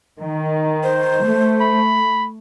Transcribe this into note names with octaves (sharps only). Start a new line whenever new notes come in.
D#3
C5
A3
B5